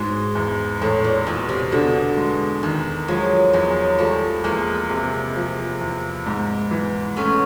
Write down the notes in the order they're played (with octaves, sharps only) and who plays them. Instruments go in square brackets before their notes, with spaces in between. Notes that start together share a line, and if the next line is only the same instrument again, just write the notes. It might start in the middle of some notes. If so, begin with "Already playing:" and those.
Already playing: [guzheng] G#2 [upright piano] B2 G#3
[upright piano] E2
[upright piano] E2 [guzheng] A2
[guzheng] A#2
[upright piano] E2 [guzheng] B2
[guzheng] C3
[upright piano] B2 [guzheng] D3
[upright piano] G#3
[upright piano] E2 [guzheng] D#3
[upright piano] F3 [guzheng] F#3 G#3
[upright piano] E2 [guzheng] F#3 G#3
[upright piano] F3 [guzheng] G3 A3
[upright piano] E2 [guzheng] G#3 A#3
[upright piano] C3
F3
E2
G#2
E3
[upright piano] A3 [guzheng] B3 C#4